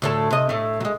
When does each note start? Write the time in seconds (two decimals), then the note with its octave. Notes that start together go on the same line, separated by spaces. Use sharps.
0.02 D2 A2 A4
0.31 C3 D#5
0.49 A2 A3
0.80 F#3 G#3